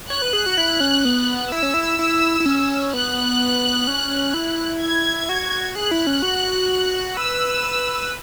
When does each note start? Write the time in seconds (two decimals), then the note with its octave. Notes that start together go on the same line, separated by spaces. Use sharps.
0.10 C#5 F#6
0.22 B4
0.33 G#4
0.46 F#4
0.58 E4
0.80 C#4
1.05 B3
1.51 E4 E6
1.63 C#4
1.74 E4
1.99 E4
2.40 E4
2.45 C#4
2.94 B3 F#6
3.87 C#4
4.34 E4
4.82 G#6
5.29 F#4
5.76 G#4 F#6
5.91 E4
6.07 C#4
6.22 F#4
7.17 B4 E6